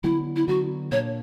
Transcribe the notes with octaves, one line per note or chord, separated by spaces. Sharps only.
D3 F#3 B3 E4
E4
D3 F#3 B3 F#4
A#2 A#3 D4 C#5